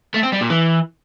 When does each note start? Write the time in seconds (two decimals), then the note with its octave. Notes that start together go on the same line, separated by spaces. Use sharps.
0.14 A3
0.23 C4
0.32 G3
0.41 A#2
0.50 E3